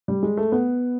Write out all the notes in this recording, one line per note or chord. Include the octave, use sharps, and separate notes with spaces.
G3
G#3
A3
B3